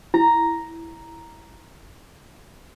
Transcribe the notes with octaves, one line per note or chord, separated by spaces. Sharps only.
E4 A#5